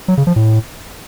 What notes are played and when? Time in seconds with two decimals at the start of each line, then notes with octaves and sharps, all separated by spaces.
0.08 F#3
0.17 C#3
0.27 F3
0.36 A2